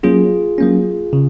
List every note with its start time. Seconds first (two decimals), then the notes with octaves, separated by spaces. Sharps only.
0.03 F#3 A#3 C#4 F4 G#4
0.58 F#3 A#3 C#4
1.13 C#3